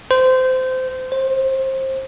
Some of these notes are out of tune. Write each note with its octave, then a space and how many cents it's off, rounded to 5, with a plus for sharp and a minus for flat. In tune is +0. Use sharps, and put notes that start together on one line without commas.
C5 -20
C5 +25